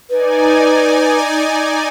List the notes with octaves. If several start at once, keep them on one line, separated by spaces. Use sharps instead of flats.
D#4 B4 D5 G#5